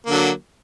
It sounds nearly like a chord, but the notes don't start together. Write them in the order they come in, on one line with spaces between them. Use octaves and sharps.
A#3 D3 F#3